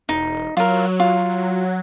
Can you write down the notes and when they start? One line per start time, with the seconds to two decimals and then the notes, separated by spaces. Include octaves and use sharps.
0.09 E1 D#4
0.57 F#3 F4 A#4
1.00 F4